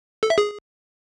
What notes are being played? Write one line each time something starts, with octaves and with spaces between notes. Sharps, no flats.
A4
E5
G#4